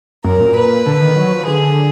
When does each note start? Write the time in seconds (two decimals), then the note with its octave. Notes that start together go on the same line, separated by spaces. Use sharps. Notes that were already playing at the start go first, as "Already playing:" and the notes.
0.24 F#2 A#4
0.40 A#2
0.56 B4
0.86 D3
1.01 D#3
1.16 F#3
1.32 F3
1.47 D3 G#4